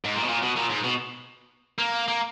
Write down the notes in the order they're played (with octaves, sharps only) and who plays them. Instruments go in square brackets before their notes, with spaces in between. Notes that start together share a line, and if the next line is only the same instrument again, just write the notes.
[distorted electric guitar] G#2
A#2
B2
A#2
B2
A#2
G#2
B2
A#3
A#3